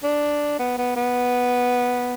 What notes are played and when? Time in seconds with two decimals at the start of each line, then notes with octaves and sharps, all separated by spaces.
0.04 D4
0.59 B3
0.78 B3
0.96 B3